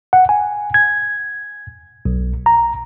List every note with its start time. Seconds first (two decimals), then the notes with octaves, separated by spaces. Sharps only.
0.13 F#5
0.29 G#5
0.74 G#6
2.05 B1
2.46 A#5